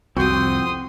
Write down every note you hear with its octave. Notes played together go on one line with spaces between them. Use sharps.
C2 F2 C4 F#4 G5 C6 D#6